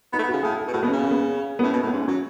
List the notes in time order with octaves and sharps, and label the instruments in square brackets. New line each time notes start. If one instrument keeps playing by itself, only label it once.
[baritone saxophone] B3 [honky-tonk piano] D#4
[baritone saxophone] A3
B3
[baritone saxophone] C#3 [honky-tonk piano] F#4
[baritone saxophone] A2 [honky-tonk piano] G#4
[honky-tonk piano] A4
[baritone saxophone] B2
[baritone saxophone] A2 [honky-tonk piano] F#4
[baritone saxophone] B2 [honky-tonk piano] B3
[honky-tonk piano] C#4
[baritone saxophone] C#3
[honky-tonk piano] C#4
B3
C#4
B3
[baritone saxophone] A2 [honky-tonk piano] C#4
[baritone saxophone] B2
A2
[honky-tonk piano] B3
[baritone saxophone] G#2 [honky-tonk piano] C#4
[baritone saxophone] F#3 [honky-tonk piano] C#4